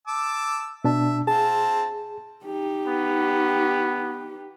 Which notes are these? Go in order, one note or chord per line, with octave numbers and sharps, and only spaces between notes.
A5 D6 E6
B2 D4 E5 A5
C4 F4 G#4 A5
D#4 G4
B3